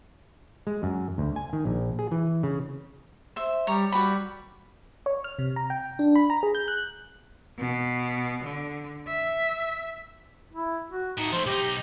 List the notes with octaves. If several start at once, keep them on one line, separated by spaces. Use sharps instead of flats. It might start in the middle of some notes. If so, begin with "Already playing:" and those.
G#3
F#2
D2
G#5
D#3
A#1
G#4
E3
C#3
C5 E5
G3 C#5 A#5
G3 F#4 B4 B5
C#5
F6
C3
A#5
G5
D4
B5
A#5
G#4
G6
F#6
B2
D3
E5
E4
F#4
A2 D#4 F#4
F3 A3 C5
B1 D#4 G4